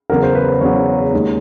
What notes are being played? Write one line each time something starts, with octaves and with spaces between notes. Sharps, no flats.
E2 C#3 F#3 A#4
C5
B4
C5
E2 C#3 F#3 C#5
D#2 D#3 G#3